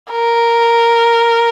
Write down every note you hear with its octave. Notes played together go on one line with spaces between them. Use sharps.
A#4